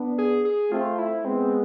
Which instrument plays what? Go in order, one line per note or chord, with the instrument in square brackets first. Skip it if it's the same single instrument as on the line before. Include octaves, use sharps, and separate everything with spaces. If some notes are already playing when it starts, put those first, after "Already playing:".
Already playing: [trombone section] B3 D4
[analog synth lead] G#4
G#4
[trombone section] A3 C4 [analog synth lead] F4
[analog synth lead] E4
[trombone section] G#3 B3 [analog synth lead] C4